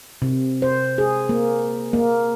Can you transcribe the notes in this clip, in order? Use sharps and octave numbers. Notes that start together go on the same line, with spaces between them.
C3
C5
G#4
A#3
A#3